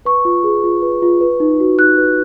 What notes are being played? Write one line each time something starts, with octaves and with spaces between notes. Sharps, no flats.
B4 C#6
F4
G#4
F4
B4
F4
B4
D#4
F#4
D#4 F#6
B4